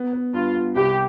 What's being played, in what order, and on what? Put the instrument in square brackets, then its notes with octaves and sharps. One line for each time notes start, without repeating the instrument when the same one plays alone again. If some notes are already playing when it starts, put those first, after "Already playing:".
Already playing: [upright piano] B3
B3
[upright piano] G2 [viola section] F4
[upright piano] B3
[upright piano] C2 [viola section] G4